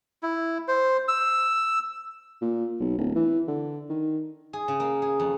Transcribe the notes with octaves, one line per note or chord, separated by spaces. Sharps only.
E4
C5
E6
A#2
B1
D1
E3
D3
D#3
G#4
C#3
A#3
G#4
F2